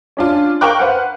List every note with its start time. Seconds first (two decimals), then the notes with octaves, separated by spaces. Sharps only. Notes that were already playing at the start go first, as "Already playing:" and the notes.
0.17 C#4 D4 F4
0.61 A#4 F5 G5 C#6 D6 F#6
0.79 B4 C5 F5 F#5